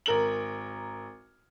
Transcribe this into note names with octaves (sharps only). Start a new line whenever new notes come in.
G#1 A#4 F#7